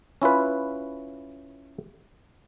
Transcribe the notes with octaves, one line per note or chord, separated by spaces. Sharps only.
C#4 E4 F4 B4